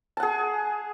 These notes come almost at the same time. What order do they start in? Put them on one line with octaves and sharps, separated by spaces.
A5 F#5 G#4